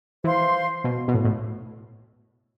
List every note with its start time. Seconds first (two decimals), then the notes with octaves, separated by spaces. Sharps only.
0.24 E3 C5 F5 C6
0.84 B2
1.08 B2
1.14 A2
1.25 A2